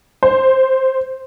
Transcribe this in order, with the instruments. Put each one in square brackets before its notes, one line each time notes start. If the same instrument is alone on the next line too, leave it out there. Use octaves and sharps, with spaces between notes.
[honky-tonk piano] C5